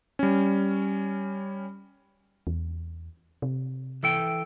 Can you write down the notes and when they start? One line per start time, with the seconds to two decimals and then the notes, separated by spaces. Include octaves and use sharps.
0.19 G3 C#4
2.47 E2
3.42 C3
4.03 E3 A4 G5